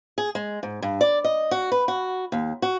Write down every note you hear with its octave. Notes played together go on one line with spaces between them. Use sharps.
G#4
G#3
G#2
G2
D5
D#5
F#4
B4
F#4
D#2
F#4